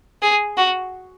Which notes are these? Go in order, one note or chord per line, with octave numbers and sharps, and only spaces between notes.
G#4
F#4